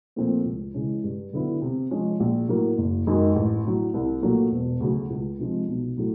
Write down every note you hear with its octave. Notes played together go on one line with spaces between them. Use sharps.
A#2 F3 A3 C4
C#2
C#3 E3 G#3 C#4
G2
D3 F#3 B3 E4
C3
F3 G#3 C#4
A#1
A2 F#3 A#3
F#1
F#2 D#3 G#3
A1
A2 F#3
C2
A#2 F#3 A3
E1
D2 C#3 F#3
C#2
C3 F3 G#3
B1
A2 F#3 A3